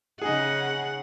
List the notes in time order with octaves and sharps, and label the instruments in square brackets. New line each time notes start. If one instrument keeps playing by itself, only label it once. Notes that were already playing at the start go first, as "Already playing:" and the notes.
[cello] C#3 F#5 [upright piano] D#4 G#4